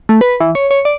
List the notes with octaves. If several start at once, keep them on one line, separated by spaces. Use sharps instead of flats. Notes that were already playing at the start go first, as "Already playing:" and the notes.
A3
B4
E3
C#5
C#5
D5